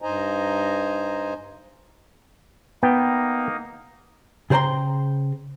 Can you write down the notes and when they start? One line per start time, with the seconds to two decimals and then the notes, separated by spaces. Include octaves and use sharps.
0.02 G2 D#4 C5 D#5 G#5 A#5
2.83 A#3 B3 D#4 G5
4.50 C#3 G#4 C5 G5 A#5 C6